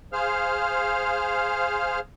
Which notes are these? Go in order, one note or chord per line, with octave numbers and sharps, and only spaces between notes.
G#4 C5 F5 F6